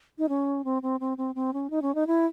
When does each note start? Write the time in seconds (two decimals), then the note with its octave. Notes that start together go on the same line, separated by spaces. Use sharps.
0.18 D#4
0.29 C#4
0.65 C4
0.82 C4
1.00 C4
1.18 C4
1.35 C4
1.53 C#4
1.70 D#4
1.82 C#4
1.95 D#4
2.07 E4